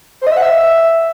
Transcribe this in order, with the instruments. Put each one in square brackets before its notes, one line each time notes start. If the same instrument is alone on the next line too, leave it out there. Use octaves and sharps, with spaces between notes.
[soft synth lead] C5
D#5
E5
F#5
E5